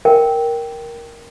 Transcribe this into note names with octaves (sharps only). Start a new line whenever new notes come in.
A#4 G5